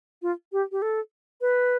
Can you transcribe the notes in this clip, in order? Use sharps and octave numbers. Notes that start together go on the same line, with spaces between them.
F4
G4
G4
A4
B4